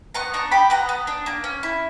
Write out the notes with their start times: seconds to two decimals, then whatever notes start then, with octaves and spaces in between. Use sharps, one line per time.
0.14 B3 A#5 C#6
0.34 D4 A#5 C#6
0.51 G4 G5 B5
0.70 B3 F#5 A#5
0.89 B3
1.07 D4
1.26 A#3
1.44 C#4
1.63 E4